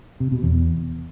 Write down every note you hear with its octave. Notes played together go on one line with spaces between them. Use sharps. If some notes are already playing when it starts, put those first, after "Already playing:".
C3
B2
E2